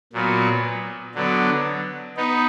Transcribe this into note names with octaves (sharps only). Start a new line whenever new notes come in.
A#2 F#3 B3
D3 F#3 B3 D4
B3 D#4